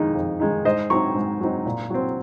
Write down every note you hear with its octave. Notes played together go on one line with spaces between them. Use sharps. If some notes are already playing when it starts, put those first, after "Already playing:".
Already playing: F2 D#3 G#3 D#4
F2
D#3 G#3 D#4
G#2 C5 D#5
F#3 C4 D#4 A#5 C#6
G#2
F#3 C4 D#4
A#2
F#3 C4